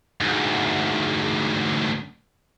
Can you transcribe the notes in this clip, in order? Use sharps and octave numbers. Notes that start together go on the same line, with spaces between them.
D2 G#2